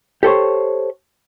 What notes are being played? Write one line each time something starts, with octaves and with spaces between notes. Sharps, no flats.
G4 A4 C5 C#5